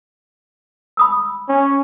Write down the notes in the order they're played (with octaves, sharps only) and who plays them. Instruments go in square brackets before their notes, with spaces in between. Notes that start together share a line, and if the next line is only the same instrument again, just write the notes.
[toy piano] B5 D#6 E6
[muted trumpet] C#4